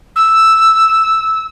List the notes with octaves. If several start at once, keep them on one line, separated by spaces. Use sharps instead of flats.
E6